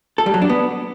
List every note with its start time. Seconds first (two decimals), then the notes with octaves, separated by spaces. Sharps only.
0.18 A4
0.26 G3
0.34 F#3
0.42 D4
0.49 B3